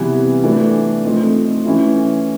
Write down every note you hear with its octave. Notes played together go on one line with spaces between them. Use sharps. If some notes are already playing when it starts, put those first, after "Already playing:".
Already playing: C3 E3 G3 B3
E3 A3 D4
F3 A3 C4 D#4
E3 A3 C#4 E4